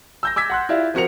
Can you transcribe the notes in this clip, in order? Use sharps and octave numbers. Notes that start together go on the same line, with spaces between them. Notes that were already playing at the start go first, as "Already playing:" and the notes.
E6 G6 A#6
D6 E6 G#6 B6
F#5 C6 F#6
E4 F4 G4 D5 E5 F5
F3 C4 F#4 A#4 C#7 F7